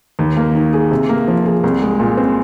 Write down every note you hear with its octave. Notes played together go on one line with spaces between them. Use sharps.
D#2
A#3
D#3
G#4
C3
A#3
F3
G#4
C2
G#3
A#2
C4